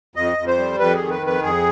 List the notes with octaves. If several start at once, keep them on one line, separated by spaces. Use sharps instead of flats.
F2 D#5
F2
C5
G3
F2 B4
D#3 G#4
B4
F2 B4
F2 G#4